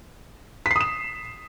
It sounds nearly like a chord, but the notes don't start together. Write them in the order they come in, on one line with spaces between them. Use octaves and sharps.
B6 C7 D#6 E7